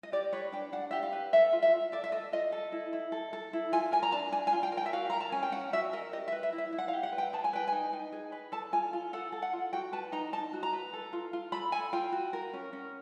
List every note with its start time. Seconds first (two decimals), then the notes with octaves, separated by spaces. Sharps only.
0.03 D#5
0.12 G4 D5
0.33 B4 C#5
0.52 D4 G5
0.72 D4 F#5
0.91 G4 E5
1.03 F5
1.12 B4
1.33 A4 E5
1.53 F4
1.62 E5
1.73 F4
1.92 A4 D5
2.04 E5
2.12 A4 D#5
2.32 F4 D#5
2.52 A4
2.72 E4
2.93 E4
3.12 A4
3.33 A4
3.53 E4
3.72 F4 G#5
3.92 A#4 G#5
4.03 A#5
4.12 D4 A5
4.32 D4 G#5
4.47 G#5
4.53 F4
4.63 G5
4.72 A#4
4.77 G5
4.86 E5
4.93 F#4 F5
5.10 A#4 A#5
5.20 A5
5.32 C#4 G#5
5.43 G5
5.52 C#4 F#5
5.73 F#4 E5
5.92 A#4 D#5
6.13 G4 D#5
6.28 E5
6.32 B4
6.43 E5
6.53 E4
6.58 E5
6.72 E4
6.78 F#5
6.88 F5
6.93 G4
7.03 F#5
7.12 B4
7.18 G5
7.33 G#4 A5
7.44 G#5
7.53 B4 G5
7.68 D#4 G#5
7.93 D#4
8.12 G#4
8.32 B4
8.52 A4 A5
8.72 F4 G#5
8.93 F4
9.13 A4 F#5
9.32 A4
9.42 F#5
9.53 F4
9.73 F#4 G5
9.93 B4 A5
10.12 D#4 A#5
10.33 D#4 A5
10.53 F#4
10.63 A#5
10.73 B4
10.93 A4
11.13 F4
11.33 F4
11.52 A4 B5
11.72 A4 G#5
11.93 F4 G5
12.12 F#4
12.33 A#4
12.53 C#4
12.73 C#4